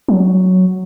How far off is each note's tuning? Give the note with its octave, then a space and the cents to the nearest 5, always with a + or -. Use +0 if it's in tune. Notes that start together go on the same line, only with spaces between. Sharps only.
F#3 +0